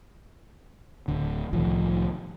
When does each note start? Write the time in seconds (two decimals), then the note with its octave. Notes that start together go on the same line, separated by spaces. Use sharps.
1.08 D1 D3
1.53 C2 A2 D#3 F3